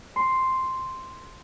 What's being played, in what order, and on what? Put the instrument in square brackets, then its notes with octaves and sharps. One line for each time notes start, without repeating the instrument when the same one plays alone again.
[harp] C6